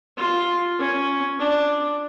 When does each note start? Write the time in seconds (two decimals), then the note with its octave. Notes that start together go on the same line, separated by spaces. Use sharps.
0.18 F4
0.79 C#4
1.39 D4